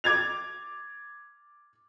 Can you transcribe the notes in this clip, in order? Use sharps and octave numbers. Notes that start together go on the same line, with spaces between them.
D6 G#6 A6 F7